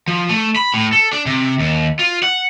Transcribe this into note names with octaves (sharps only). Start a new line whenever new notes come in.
F3
A3
B5
A2
A4
D4
C3
D#2
F4
F#5